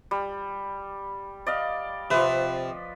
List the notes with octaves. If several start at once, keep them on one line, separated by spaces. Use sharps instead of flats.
G3
D5 D#5 F5
C3 F3 B4